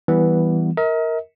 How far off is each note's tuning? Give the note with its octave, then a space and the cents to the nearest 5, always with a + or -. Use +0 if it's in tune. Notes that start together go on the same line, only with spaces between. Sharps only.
E3 -5 G3 -5 B3 +0
A#4 +0 D#5 +45